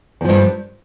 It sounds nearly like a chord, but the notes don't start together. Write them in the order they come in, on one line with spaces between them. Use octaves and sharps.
E2 F3 G2